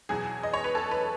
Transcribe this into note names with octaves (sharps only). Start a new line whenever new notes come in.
E2 B2 F#3 G#4
D#5
C#5
B4
A4
B4